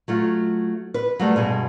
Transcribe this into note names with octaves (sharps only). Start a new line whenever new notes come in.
F#3 A3 F4
B4
F#3 G3 A3
G2 B2 G#3